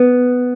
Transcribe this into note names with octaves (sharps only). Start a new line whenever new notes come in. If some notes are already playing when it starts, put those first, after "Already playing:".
Already playing: B3